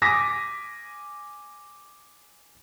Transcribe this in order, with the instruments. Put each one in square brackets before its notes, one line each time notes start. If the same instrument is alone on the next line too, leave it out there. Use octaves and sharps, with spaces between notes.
[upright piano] G#5 D6 D#6 A#6 B6